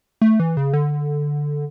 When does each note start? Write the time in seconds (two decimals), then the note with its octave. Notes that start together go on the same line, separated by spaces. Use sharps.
0.22 A3
0.40 E3
0.57 C#3
0.73 D3